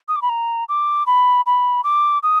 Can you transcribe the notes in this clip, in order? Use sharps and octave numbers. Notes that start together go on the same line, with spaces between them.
D#6
D6
B5
A#5
D6
B5
B5
D6
D#6